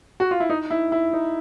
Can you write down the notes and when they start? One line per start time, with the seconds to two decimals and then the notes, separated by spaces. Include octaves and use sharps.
0.20 F#4
0.31 F4
0.40 E4
0.50 D#4
0.71 E4
0.92 E4
1.13 D#4